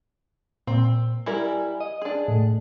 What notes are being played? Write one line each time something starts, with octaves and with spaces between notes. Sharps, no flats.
A#2 C4
G3 E4 A#4 G#5
D#5
D4 G#4
A2